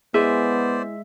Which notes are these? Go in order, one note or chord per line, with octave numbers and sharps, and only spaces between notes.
G#3 B3 E4 G#4 C5 D5 E5 G#5